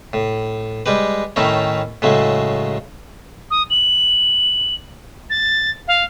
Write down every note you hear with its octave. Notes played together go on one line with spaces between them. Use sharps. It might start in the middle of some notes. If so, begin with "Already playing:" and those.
A2
G3 G#3 G4 B4
A2 D#3 A3 C#4 D#4 E4
A2 C#3 F#3 G#3 A3
D#6
F#7
A6
F5